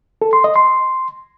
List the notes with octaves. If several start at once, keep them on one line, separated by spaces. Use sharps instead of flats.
A4
C6
D#5
C6